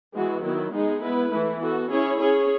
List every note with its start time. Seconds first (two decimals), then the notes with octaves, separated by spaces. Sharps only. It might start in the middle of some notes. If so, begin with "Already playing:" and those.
0.14 E3 G#3 B3 F#4
0.43 D#3 F#3 B3 E4
0.72 G#3 B3 D#4 G#4
1.02 B3 E4 B4
1.31 E3 A3 E4
1.61 B3 F#4 A4
1.90 C#4 E4 G#4 C#5
2.19 C#4 G#4 C#5